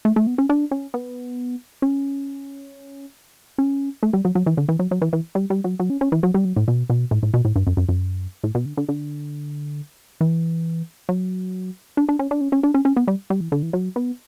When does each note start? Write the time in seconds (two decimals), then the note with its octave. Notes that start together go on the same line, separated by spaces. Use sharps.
0.05 A3
0.16 A3
0.27 B3
0.38 C#4
0.49 D4
0.71 C#4
0.94 B3
1.82 C#4
3.58 C#4
4.03 A3
4.13 G3
4.25 F#3
4.35 F#3
4.46 E3
4.57 D3
4.69 E3
4.79 F#3
4.91 F#3
5.02 E3
5.13 E3
5.35 G3
5.50 G3
5.64 F#3
5.80 F#3
5.90 C#4
6.01 C#4
6.12 E3
6.23 F#3
6.34 G3
6.45 F#3
6.57 A2
6.68 B2
6.90 B2
7.11 A2
7.23 A2
7.34 B2
7.45 A2
7.56 G2
7.67 F#2
7.77 F#2
7.89 F#2
8.44 A2
8.55 B2
8.66 D3
8.77 D3
8.89 D3
10.21 E3
11.09 F#3
11.97 D4
12.09 D4
12.19 C#4
12.31 D4
12.41 C#4
12.52 C#4
12.63 D4
12.74 C#4
12.85 C#4
12.97 B3
13.08 G3
13.30 G3
13.41 E3
13.52 D3
13.63 E3
13.73 F#3
13.96 B3